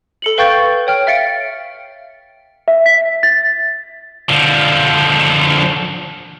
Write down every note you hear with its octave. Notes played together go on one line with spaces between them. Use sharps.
A4 C#7 F#7
B4 F5 G5 C#6 G6 A6
C#5 G5 F6
E5 F5 A6 C#7 D7
E5
B6
A6
D3 F3